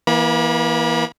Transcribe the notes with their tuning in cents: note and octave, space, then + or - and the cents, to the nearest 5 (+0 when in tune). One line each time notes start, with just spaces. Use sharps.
E3 +0 A#3 +35 B5 -35